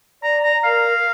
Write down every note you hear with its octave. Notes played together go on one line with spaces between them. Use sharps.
D5 A#5
A#5
A#4 F5